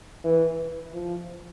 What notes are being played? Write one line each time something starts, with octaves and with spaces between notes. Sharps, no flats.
E3
F3